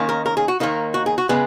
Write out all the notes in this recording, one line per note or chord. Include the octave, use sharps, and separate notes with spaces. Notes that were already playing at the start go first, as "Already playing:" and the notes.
Already playing: D#2 D#3 A#3 C#4
A#4
A#4
G#4
F#4
D#2 D#3 A#3 D#4
F#4
G#4
F#4
C#3 G#3 B3 G#4